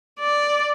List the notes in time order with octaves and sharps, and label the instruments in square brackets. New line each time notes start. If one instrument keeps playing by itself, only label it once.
[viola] D5